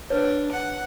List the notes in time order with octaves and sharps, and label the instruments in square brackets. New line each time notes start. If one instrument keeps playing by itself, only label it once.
[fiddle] D4 [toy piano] B4 C#5
[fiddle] F#5